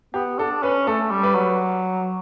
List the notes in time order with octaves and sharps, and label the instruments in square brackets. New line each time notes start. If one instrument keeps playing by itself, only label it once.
[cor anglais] B3 [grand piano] G4
[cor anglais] D4 [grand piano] A4
[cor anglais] C#4 [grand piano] B4
[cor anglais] A3 [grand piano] A4
[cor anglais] G3
[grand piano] B4
[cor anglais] F#3